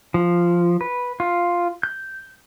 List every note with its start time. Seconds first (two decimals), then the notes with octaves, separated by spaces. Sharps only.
0.14 F3
0.81 B4
1.20 F4
1.83 G6